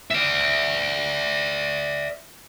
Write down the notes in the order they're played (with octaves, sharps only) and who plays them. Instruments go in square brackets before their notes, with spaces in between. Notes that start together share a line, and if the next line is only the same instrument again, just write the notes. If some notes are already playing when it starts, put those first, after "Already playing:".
[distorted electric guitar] D5 E5